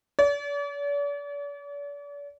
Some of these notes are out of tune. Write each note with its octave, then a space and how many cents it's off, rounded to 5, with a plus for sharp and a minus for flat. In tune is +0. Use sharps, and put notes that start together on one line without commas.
D5 -45